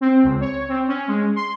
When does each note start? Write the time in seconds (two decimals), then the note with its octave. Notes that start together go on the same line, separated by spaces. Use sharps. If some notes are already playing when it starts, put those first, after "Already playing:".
0.01 C4
0.23 C#2
0.41 C#5
0.69 C4
0.88 C#4
1.08 G#3
1.36 C6